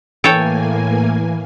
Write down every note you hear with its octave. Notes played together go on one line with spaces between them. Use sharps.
A2 E3 A#3 A4 C#5 G5 G#5